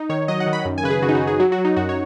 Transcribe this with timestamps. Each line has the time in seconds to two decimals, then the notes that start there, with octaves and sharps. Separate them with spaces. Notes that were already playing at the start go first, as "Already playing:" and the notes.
Already playing: D#4
0.09 D#3 C#5
0.28 F#3 D#5
0.40 F#5
0.47 D#3
0.53 B5
0.65 F#2
0.78 G#5
0.83 C#3 B4
0.90 G#4
1.02 C#3 F#4
1.08 D#4
1.15 F#4
1.21 D#4
1.27 G#4
1.39 F#3 F#4
1.52 F#4
1.58 F#3
1.65 D#4
1.77 F#2 F#4
1.89 C#5